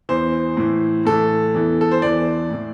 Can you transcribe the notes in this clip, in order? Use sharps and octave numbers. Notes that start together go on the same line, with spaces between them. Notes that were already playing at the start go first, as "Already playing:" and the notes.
E2 E3 C5
A2 E3
A2 E3 A4
E2 E3
A4
C5
E2 E3 D5
A2 E3